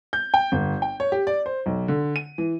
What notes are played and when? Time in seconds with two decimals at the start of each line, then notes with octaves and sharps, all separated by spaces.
0.13 G6
0.34 G5
0.52 G1
0.82 G5
1.00 C#5
1.12 G4
1.27 D5
1.46 C5
1.66 B1
1.88 D3
2.16 D#7
2.38 E3